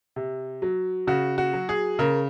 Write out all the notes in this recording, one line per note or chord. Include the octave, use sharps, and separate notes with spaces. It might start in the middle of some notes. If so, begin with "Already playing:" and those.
C3
F#3
C#3 F#4
F#4
F#3
G#4
C#3 A#4